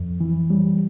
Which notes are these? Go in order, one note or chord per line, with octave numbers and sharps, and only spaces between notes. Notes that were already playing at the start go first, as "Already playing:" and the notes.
Already playing: F2
E3
G3